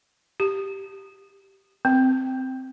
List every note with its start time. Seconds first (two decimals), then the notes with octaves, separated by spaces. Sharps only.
0.40 G4
1.85 C4